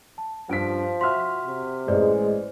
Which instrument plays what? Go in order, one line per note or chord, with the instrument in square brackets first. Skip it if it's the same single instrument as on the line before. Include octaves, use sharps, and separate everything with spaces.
[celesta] A5
[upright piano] G2 B6 [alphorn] F3 [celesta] F4 D7
[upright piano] F#4 E5 F6 [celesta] C6 B6
[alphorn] C3
[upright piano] A1 [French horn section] G#3 [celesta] B4 C5 D5